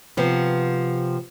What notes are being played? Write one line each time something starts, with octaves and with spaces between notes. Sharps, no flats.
C3 F3 B3